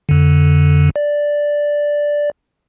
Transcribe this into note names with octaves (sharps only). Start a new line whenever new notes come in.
F2 D3
D5